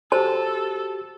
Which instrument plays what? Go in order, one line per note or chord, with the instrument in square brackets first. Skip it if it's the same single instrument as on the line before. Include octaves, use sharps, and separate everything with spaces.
[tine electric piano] F#4 G4 [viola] A4 [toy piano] C5 A5